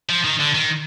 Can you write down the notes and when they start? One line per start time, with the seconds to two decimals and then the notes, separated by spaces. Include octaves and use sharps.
0.09 F3
0.24 D#3
0.40 D3
0.54 D#3